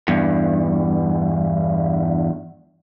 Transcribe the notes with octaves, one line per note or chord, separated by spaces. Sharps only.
E2 G2